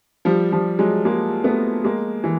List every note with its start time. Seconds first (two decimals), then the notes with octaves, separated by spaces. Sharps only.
0.25 F3 G3
0.52 F3 G3
0.79 F#3 G#3
1.05 G#3 A#3
1.44 A3 B3
1.84 G#3 A#3
2.24 E3